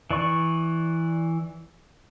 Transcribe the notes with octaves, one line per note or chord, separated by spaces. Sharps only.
E3 D5 C#6